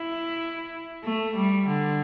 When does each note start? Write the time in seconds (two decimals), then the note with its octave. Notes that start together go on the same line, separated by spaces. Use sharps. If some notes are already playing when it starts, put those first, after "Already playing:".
Already playing: E4
1.04 A3
1.35 G3
1.68 D3